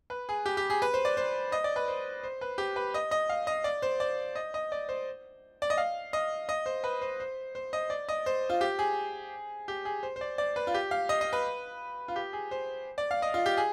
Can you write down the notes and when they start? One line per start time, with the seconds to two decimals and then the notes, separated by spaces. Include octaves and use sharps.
0.10 B4
0.29 G#4
0.46 G4
0.57 G4
0.70 G#4
0.82 B4
0.94 C5
1.05 D5
1.17 C5
1.52 D#5
1.64 D5
1.76 B4
1.88 C5
2.24 C5
2.41 B4
2.58 G4
2.76 B4
2.94 D#5
3.11 D#5
3.29 F5
3.47 D#5
3.64 D5
3.82 C5
4.00 D5
4.35 D#5
4.54 D#5
4.72 D5
4.89 C5
5.62 D5
5.70 D#5
5.78 F5
6.13 D#5
6.49 D#5
6.66 C5
6.84 B4
7.02 C5
7.20 C5
7.55 C5
7.73 D#5
7.90 D5
8.09 D#5
8.26 C5
8.50 F4
8.61 G4
8.79 G#4
9.68 G4
9.85 G#4
10.03 C5
10.16 C5
10.21 D5
10.38 D5
10.56 B4
10.67 F4
10.74 G4
10.91 F5
11.09 D#5
11.21 D#5
11.33 B4
12.08 F4
12.16 G4
12.33 G#4
12.51 C5
12.98 D5
13.11 F5
13.22 D#5
13.34 F4
13.46 G4
13.57 G#4